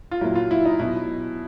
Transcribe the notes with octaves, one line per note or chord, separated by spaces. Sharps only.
F4
A#2 F#3 E4
F4
E4
D#4
B2 F#3 E4